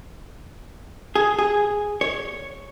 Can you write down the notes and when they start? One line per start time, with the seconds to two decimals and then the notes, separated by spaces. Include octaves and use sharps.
1.15 G#4
1.39 G#4
2.01 C#5